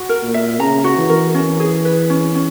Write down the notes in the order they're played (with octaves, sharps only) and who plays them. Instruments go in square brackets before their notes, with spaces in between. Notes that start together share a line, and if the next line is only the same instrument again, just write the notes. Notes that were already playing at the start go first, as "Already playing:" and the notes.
Already playing: [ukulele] F#4
A#4
[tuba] A#2
[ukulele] E5
[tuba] C#3 [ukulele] A#5
[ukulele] F#4
[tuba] E3
[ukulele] A#4
C#4
G#4
B4
C#4
C#4